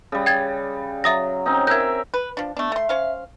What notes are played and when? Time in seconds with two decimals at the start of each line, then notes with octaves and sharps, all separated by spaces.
0.12 C#3 G3
0.26 G5 G#6 A6
1.04 F#3 E5 D#6 A#6
1.46 C4 C#4 D#4
1.67 A#4 E5 G6 G#6
2.14 B4
2.37 F3 D4
2.57 A3 B3 D4
2.72 A3 E5 C6
2.89 C#4 C5 F5